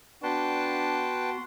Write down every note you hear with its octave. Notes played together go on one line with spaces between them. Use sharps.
B3 D4 F#4 B4 F#5 G5 A5 C6